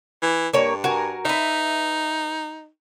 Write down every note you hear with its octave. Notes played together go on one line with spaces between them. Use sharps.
E3
G2 A#3 C#5
F#4 A#4 G#5
D#4 B4 E5